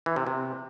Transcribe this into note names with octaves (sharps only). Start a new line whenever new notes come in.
E3
C3
C3